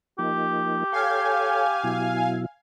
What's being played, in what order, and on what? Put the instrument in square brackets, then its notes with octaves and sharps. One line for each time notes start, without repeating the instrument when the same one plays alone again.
[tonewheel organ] F3 A#3 D#4 [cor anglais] G4
[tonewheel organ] A4 C#5 G5 [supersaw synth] F5 G#5
[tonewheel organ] B2 F#3 E4